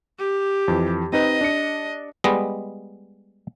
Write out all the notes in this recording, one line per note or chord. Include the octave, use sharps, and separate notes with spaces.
G4
F2 E3
C4 D#4 B4 D#5
D4 C#7
G3 G#3 B3 D#5